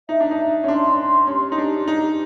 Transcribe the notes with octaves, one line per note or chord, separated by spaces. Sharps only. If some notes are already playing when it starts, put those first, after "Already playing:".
D#4 E5
D4
D#4
E5
C#4
D4 C6
C6
C#4 G4
D#4
D4 G4
D#4 G4